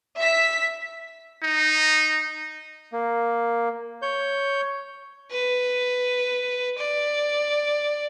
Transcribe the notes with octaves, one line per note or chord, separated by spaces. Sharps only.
E5 B6
D#4
A#3
C#5 G6
B4
D5